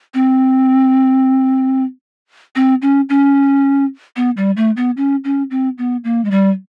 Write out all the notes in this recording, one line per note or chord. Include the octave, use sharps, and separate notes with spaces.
C4
C4
C#4
C#4
B3
G3
A3
B3
C#4
C#4
C4
B3
A#3
G#3
G3